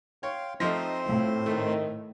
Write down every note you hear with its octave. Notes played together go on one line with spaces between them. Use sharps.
C#5 F5 G5 C6
F3 A3 C4 D#4 C5 D#5 C6
A2 E4 F4
D#3 A3